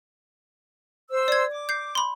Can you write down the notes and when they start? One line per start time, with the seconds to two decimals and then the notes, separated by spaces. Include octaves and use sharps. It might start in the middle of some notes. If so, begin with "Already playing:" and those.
1.10 C5 E6
1.28 D5 G#6
1.51 D6
1.69 G6 C7
1.95 B5 C6